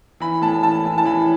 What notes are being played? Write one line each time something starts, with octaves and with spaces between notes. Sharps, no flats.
E3 B5
A2 A5
E3 A5
E3
A5
E3 B5